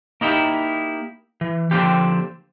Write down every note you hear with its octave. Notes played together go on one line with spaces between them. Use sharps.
A#3 D#4 E4 G4
E3
D3 F3 A#3 C4 F4 G4